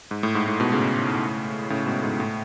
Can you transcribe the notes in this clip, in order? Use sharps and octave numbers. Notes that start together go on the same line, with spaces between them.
G#2
A2
G#2
A2
G#2 B2
A2 C#3
A2 C#3
G#2 B2
G#2
A2